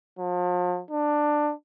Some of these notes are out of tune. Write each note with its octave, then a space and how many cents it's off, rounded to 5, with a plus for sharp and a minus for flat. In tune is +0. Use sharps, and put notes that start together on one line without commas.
F3 +40
D4 +15